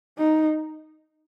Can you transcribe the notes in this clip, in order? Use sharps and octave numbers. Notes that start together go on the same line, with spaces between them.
D#4